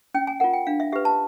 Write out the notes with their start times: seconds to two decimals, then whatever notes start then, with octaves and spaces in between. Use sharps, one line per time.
0.14 C#4 G5
0.27 G#5
0.40 F4 A#4 F#5
0.53 G5
0.67 D4 F5
0.80 E5
0.92 G4 B4 E5
1.05 A5